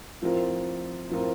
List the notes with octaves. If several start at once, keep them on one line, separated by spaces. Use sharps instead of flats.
A2 F3 C4 F4 A#4
A2 F3 C4 F4 A#4